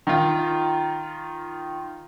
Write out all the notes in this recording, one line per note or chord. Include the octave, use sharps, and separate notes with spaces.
D#3 F4